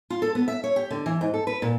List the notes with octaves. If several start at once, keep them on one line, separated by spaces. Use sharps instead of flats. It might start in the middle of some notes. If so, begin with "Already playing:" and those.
F4
A4
B3
E5
C#5
G4
D3
E3
G#2
A4
B4
A#2